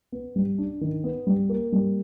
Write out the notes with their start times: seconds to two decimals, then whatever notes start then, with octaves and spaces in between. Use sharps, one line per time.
0.12 B3
0.36 G3
0.58 D4
0.81 D#3
1.04 B3
1.27 G3
1.49 A#3
1.72 G3